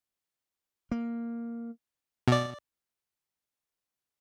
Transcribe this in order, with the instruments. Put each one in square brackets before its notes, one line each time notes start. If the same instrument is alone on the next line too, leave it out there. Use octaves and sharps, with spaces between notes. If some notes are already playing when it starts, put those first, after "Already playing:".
[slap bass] A#3
[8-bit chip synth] B2 D5